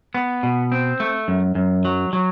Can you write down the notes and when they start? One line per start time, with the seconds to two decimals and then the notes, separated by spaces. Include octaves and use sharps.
0.14 B3
0.43 B2
0.72 C4
1.00 A3
1.28 F#2
1.55 F#2
1.85 F#3
2.13 F#3